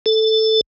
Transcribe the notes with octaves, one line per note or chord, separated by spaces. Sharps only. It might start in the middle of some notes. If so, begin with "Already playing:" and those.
A4